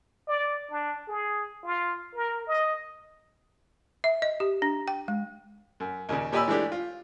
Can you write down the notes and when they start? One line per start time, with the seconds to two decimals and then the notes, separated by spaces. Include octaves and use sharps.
0.27 D5
0.71 D4
1.08 G#4
1.64 F4
2.15 A#4
2.47 D#5
4.04 E5
4.22 D#5
4.40 G4
4.62 D4
4.88 G5
5.08 G#3
5.80 F#2
6.09 D#2 A#2 C#3
6.32 A#2 G4 D#5 G#5 B5 E6
6.48 E3 G#3 A3 D4 G4
6.72 F4